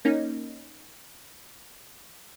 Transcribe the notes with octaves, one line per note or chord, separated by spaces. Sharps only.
A#3 C#4 D#4